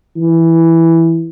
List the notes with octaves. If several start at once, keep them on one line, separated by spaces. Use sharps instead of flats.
E3